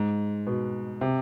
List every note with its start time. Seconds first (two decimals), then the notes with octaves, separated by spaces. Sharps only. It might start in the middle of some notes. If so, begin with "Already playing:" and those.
Already playing: G#2
0.47 B2
1.01 C3